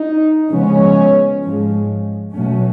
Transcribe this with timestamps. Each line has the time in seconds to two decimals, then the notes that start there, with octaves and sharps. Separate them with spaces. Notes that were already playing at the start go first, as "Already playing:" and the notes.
Already playing: D#4
0.50 C#3 F3 G#3 B3 C#4
1.43 G#2 F3 G#3
2.34 B2 F#3 A3 C#4